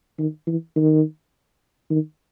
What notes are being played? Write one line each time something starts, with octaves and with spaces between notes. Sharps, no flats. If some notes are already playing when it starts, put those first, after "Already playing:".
D#3
E3
D#3
D#3